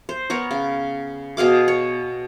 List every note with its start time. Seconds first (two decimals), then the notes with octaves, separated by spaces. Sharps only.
0.09 C5
0.30 B3 A#4 C#5
0.51 C#3
1.37 B2 G#4 F5 D6
1.68 C#5